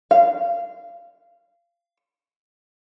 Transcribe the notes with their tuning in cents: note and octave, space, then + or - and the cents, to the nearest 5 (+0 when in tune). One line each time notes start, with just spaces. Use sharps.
F5 -20